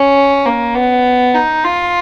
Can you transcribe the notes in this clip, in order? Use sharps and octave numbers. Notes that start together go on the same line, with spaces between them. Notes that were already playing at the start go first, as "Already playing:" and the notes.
Already playing: C#4
A#3
B3
D#4
F4